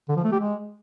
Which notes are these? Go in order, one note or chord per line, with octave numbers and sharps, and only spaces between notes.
D3
F3
A3
G4
G#3